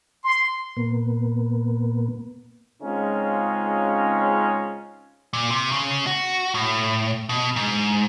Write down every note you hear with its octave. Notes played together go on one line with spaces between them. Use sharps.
C6
A#2 A#3 B3
C#3 G#3 C4 C#4 D#4 F4
A#2
C3
C#3
F#4
A2
B2
G#2